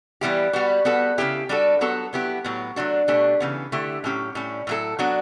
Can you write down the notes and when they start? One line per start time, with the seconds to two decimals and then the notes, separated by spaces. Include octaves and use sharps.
0.21 E3 G3 B3 E4 G4
0.53 G3 B3 F#4
0.85 G3 B3 F#4 A4
1.18 C#3 E3 B3 E4 G4
1.49 G3 D4 F#4 A4
1.81 F#3 B3 F#4 A4
2.13 F#3 B3 E4 G4
2.44 A2 F#3 B3
2.76 F#3 A3 D4 F#4
3.08 B2 A3 D4 G4
3.40 C#3 E3 B3
3.72 D3 A3 E4 G4
4.04 A2 F#3 C#4 G4
4.35 A2 G3 C#4
4.67 A2 F#3 A3 E4 A4
4.99 F#3 B3 D4 F#4